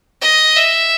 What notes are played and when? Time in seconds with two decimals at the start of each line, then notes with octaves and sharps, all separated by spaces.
0.22 D#5
0.56 E5